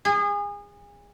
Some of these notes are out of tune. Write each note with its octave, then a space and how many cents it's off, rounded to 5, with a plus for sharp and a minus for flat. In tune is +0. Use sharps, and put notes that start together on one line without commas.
G#4 -30